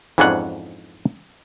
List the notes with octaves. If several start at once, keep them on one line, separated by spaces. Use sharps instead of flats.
F2 G#2 E3 C#4 D4 F#5